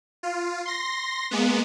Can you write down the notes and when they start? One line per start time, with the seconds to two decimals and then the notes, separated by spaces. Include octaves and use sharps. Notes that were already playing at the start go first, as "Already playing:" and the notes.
0.23 F4
0.65 C6 A#6
1.31 G#3 A#3 B3